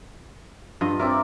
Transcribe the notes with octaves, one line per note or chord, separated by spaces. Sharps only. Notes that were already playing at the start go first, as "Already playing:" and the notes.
G2 F4 D#5
C4 A#4 D5 E5